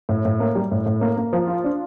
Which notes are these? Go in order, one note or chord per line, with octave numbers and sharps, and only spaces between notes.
A2
A2
A#3
G3
A2
A2
A#3
A#3
F3
F4
D4